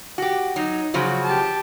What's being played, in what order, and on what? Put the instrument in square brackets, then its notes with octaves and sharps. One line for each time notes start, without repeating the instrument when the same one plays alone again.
[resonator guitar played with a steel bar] F#4 G4
[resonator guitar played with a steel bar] F#3 [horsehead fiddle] D#4
[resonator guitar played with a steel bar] C#3 F3 F#3 [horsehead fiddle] F#4
[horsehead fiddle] G4 A5